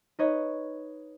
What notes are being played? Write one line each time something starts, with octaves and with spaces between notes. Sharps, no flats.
D#4 B4 C#5 D#5